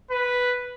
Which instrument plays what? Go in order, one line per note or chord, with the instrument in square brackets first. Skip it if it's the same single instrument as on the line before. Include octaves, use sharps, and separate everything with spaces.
[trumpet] B4